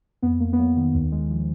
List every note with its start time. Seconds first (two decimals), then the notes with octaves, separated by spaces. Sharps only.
0.22 F2 B3
0.40 F2 A#3
0.53 B3
0.59 F#3 A#3
0.76 D#3
0.94 D#2
1.12 G#3
1.30 F3